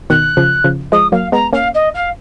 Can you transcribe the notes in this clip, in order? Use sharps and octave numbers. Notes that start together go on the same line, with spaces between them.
B2 D#3 F#6
C#3 F3
C#3 F3
F3 G#3 D#6
F#3 A#3 F5
G#3 B3 A#5
A#3 C#4 F5
D#5
F5